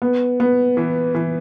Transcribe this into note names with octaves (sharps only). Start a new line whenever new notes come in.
B3
B3
E3
E3